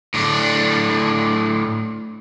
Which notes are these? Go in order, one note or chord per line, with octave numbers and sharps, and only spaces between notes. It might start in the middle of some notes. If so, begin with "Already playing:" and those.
A2 D4